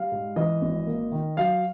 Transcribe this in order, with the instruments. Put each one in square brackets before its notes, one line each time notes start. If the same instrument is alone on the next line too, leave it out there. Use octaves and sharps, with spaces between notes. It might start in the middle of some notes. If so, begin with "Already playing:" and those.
Already playing: [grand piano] G3 F5
G#2
E3 D#5
G#1
A#3
D#3
F#3 F5